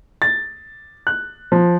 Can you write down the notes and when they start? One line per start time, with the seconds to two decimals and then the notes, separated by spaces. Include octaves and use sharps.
0.22 A6
1.07 F#6
1.52 F3